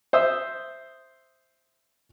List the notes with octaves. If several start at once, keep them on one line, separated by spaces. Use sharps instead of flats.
C5 E5 D#6 E6